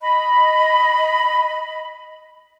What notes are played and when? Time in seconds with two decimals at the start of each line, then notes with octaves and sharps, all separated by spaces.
0.02 D#5 B5